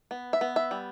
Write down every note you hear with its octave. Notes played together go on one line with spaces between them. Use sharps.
B3
E5
B3
E5
G3